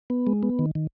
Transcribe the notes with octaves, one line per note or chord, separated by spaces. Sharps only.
B3
G#3
B3
D#3
D#3